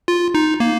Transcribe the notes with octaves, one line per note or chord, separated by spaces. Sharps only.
F4
D#4
A#3